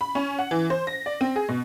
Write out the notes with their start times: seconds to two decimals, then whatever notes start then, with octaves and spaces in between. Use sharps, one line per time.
0.01 B5
0.15 C#4
0.39 F#5
0.51 E3
0.70 C5
0.87 A#6
1.06 D5
1.21 C4
1.36 G#4
1.49 B2